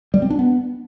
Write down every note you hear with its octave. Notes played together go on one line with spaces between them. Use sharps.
G3
C4
D4
B3